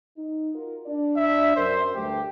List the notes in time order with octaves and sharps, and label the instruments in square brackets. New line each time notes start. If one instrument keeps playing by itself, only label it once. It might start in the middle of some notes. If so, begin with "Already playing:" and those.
[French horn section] D#4
F4 F#4 A#4
D4 D5
[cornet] E5
[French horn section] F#2 A#4 [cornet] C5
[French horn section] D2 G2 A3 [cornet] G4